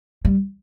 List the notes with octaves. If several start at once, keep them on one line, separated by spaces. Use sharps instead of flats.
G3